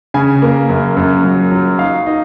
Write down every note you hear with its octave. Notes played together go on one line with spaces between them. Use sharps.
C#3 G#5
A#3
F#2
F#2
F#3
F#3
D#4 F5
D#4